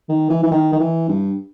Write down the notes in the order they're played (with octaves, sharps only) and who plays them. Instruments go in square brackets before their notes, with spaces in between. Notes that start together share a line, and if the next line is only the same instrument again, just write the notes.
[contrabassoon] D#3
E3
E3
D#3
D#3
E3
G2